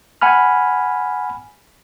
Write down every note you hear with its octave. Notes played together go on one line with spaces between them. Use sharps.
F#5 G#5 B5 F6